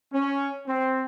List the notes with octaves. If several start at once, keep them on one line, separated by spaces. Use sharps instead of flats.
C#4
C4